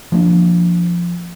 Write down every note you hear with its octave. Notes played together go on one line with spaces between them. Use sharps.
F3 A#3 D4